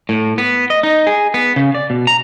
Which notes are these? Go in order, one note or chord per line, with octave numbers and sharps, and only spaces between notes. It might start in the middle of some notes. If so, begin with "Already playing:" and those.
A2
B3
D#5
D#4
G#4
B3
C#3
D5
B2
A#5